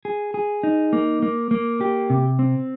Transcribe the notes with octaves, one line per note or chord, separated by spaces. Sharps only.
G#4
G#4
D#4
A#3
A#3
A#3
G4
C3
C4